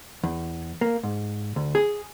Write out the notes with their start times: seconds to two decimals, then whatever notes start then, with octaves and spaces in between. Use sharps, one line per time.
0.24 E2
0.81 A#3
1.03 G#2
1.56 D2
1.75 G#4